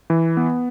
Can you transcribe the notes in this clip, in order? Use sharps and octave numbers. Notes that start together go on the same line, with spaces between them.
E3
B3